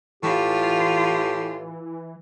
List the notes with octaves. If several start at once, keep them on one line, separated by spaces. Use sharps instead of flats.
A2 E3 F4 G4